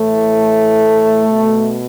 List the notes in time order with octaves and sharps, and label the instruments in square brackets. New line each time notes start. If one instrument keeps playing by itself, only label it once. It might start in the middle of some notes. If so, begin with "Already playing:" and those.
Already playing: [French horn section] A2 E3 A3
B2